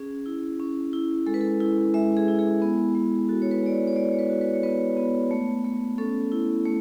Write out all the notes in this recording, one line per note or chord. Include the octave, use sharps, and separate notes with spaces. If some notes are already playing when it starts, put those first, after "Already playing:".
Already playing: C#4 G#4
E4
C#4
E4
G#3 A4
B4
A4
E4
G#3 E5
G#4
E4
G#4
B3
G#3
F#4 A4
C#5
B4
G#3 D5
C#5
C#5
G#3 D5
C#5
B4
F#4
B4
C#5
B3 B4
B3
A3
A3
C#4 A4
E4
A3